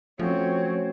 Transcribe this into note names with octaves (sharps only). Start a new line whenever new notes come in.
F3 A3 C4 C#4 F#4 C#5